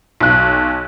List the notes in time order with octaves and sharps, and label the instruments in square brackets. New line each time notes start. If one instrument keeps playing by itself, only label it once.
[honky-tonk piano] B1 F#6